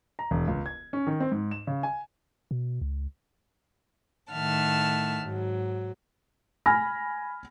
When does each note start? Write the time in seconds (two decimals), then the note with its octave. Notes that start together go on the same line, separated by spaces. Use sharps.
0.19 A#5
0.31 E1
0.47 C#2
0.66 G#6
0.93 C#4
1.07 D#3
1.20 C4
1.32 G#2
1.51 E7
1.67 C#3
1.83 G#5
2.51 B2
2.81 C#2
4.31 A2 D#3 E5 F#5 A5 F6
5.22 G#2 F#3
6.66 G#5 B5 F6 A#6